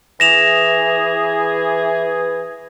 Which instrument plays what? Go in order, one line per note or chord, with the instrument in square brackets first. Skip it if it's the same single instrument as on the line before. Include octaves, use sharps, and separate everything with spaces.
[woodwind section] E3 G#4 [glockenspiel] A#6 E7 F7